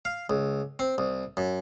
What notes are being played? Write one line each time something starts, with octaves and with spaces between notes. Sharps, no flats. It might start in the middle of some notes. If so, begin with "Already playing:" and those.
F5
C#2
C4
C2
F#2